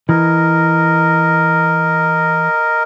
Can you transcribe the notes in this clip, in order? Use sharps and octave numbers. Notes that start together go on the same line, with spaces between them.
E3 A#4 D#5